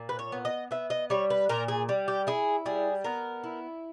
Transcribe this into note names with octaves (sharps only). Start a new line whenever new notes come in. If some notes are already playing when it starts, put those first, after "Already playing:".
Already playing: A#2
B4
C#5
B3
D#5
B3 E5
D#5
G3 C#5
B4
A#2 A#4
G#4
G3
G4
E4 G#4
G3 G#4
B3 A#4
E4